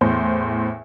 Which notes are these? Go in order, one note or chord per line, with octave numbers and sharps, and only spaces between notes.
E2 A2 C5